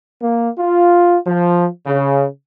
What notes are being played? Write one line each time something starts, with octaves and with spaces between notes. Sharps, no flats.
A#3
F4
F3
C#3